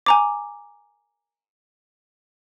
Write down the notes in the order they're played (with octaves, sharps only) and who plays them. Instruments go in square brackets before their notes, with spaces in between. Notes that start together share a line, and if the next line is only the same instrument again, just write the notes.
[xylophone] G#5 A#5 D6